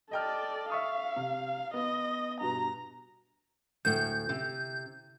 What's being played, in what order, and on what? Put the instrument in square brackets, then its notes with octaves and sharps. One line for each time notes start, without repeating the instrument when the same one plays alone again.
[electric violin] A4 D5 [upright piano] D#5 G5 F6
[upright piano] E5 C#6 D#6 [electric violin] F5
[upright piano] C3
[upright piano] B3 [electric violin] D#5
[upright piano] G2 B2 [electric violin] A#5
[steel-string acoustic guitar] D2 A2 [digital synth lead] G6
[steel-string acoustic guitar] C3